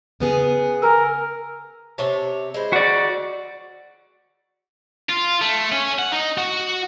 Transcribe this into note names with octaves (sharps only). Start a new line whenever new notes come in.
C#3 B3 G#4
A#4 G#5 A#5 E6
C3 C#5 A5
G#3 E4 C5
F#4 D5
F4
A3
C#4
F#5
D#4
F#4